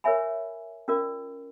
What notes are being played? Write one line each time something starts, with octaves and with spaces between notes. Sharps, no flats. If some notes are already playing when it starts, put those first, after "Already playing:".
A#4 C#5 E5 G#5 B5
C#4 F4 A#4 D5